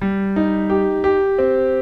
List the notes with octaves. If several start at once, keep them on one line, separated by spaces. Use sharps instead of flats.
G3
D#4
G4
G4
C4